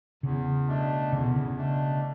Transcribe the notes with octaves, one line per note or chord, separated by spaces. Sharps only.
E2 C#3
B2 A3 D4
E2 C#3
B2
C#3
B2 A3 D4